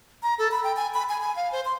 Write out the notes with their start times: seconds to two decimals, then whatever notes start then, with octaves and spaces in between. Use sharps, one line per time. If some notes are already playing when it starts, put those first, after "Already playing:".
0.23 A#5
0.38 A4
0.51 B5
0.63 G5
0.77 G#5
0.94 B5
1.09 G#5
1.21 G#5
1.36 F5
1.52 C5
1.65 C6